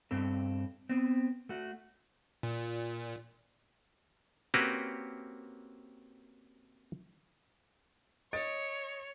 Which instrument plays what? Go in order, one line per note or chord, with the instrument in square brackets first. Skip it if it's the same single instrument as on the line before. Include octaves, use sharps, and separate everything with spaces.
[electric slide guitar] G2 C4 A4
B3 C4
A3 F#4
[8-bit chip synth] A#2
[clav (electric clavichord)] A#3 C4 C#4 F#4 G4 B4
[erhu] C#5 [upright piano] D#5 A6 D7